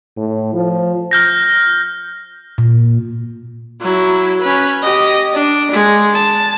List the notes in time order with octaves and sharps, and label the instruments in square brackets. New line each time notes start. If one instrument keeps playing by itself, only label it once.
[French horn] A2
F3
[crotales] F6 G6 A#6
[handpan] A#2
[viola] F#3 E4
C#4 B4
G4 D#5
D4
G#3
A5